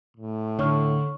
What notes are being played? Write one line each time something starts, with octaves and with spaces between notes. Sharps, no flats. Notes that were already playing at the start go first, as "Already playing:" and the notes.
A2
D3 C#5 C#6 F6